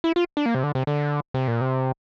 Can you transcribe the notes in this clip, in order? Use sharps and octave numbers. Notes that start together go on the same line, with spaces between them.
E4
F4
D4
A#3
C3
D3
C3
D3
C3
A#2
C3